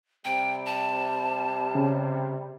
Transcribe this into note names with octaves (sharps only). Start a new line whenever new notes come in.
C3 G3 G5
A5
C#3